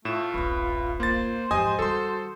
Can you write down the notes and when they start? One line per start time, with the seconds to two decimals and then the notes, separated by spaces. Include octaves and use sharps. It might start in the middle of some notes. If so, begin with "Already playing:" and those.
0.05 A2 A3 F4 E7
0.34 D1 A1 B4
1.00 A#3 C5 A6
1.51 F2 G#2 G4 D#5 G#5 D#6
1.79 D#3 G3 F#4 A4 C6